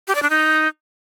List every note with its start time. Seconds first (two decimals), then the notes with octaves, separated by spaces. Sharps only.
0.08 G4
0.15 D5
0.23 D4
0.30 D#4